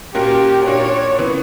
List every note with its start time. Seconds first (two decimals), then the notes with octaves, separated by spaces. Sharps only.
0.14 A#2 A#3 C#4 F#4 G4 A#4
0.66 A#2 A#3 D4 F#4 C#5
1.19 C#3 E3 B3